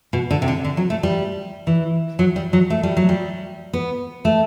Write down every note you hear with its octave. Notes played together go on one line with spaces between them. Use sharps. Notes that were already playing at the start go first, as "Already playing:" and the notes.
B2
D3
C3
D3
D3
F#3
A3
G3
E3
F#3
G3
F#3
A3
G3
F#3
G3
B3
A3